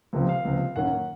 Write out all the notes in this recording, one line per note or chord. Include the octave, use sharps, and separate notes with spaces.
C#2 C3 F3 C4
F5
C#2 C3 F3 C4
F#2 D#3 A#3 C#4 F#5